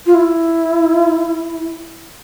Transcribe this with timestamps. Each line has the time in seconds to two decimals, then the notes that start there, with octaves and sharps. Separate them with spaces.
0.06 F4
0.15 E4